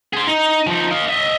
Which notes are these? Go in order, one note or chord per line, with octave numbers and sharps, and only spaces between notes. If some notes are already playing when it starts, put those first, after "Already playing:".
G#4 C5
D#4
F3 D#4
D#5 F5
D#5 E5